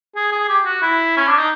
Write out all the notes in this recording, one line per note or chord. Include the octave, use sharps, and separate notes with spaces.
G#4
G#4
G4
F#4
E4
C#4
D4
D#4